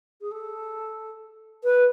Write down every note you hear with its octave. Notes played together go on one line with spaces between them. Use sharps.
G#4
A4
B4